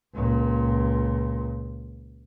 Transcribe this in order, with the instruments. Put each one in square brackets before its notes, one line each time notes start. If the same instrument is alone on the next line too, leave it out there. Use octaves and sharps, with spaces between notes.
[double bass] C#2 A#2